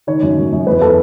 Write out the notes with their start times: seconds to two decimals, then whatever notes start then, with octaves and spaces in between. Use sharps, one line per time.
0.07 D#3 C#5
0.22 F#2
0.37 F#2
0.52 F#2
0.67 E2 B4
0.82 E3 A4